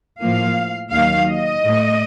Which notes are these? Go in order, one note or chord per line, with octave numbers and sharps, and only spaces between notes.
A2 F3 A#3 F5
D#2 D#3 F#3 F5
D#5
A2 A3